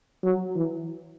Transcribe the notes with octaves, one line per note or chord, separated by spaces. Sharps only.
F#3
E3